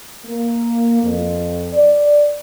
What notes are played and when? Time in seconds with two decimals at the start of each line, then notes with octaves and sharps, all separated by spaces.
0.26 A#3
1.03 F2
1.74 D5